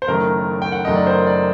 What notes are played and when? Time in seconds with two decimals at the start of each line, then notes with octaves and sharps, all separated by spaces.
0.02 C5
0.07 F#1 F#2 D#3 A3 D#4 A#4
0.62 G5
0.72 F#5
0.85 F#1 F#2 D#3 A3 D#4 D#5
0.95 D5
1.07 C5
1.27 D5